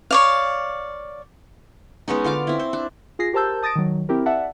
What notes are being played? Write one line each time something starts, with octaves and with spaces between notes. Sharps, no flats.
C#5 D5 F5
G#3 B3 C#4 D#4
D3 F4 F5 D6
C4 E4
C5
D4
F4 G#4 A#6 C7
G4 A#4 C5 A5 E6 G6
A5 D#6 A6 A#6 D7
D#3 F#3
C4 E4 G4 A#4
D5 E5 F#5 A5